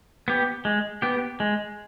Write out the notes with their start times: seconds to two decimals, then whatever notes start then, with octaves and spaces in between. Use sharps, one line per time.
0.28 B3 G4
0.65 G#3
1.02 B3 G4
1.40 G#3